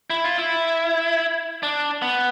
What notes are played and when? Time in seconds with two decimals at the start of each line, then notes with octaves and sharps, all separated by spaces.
0.10 E4
0.24 F4
0.37 E4
1.63 D4
2.02 B3